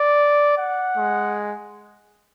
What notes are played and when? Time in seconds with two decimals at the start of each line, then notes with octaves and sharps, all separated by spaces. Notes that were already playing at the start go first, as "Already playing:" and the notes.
Already playing: D5
0.59 F#5
0.97 G#3